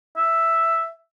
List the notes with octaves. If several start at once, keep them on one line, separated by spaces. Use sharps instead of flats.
E5